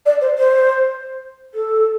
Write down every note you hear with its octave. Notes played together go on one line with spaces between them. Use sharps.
D5
C5
C5
A4